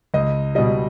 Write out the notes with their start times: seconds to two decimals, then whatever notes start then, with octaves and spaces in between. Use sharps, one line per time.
0.14 C#2 D#5
0.55 B2 G3 D#5